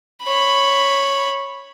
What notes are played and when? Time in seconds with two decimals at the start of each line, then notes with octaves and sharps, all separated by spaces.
0.23 C#5 B5